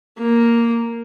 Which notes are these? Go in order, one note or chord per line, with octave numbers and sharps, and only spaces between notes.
A#3